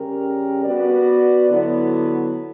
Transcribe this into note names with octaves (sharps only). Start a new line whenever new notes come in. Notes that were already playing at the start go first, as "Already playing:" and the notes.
Already playing: C#3 G3 C#4 G4 A#4
B3 F#4 B4 D5
D3 F#3 B3 E4